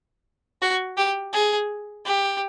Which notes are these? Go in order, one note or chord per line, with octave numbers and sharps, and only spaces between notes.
F#4
G4
G#4
G4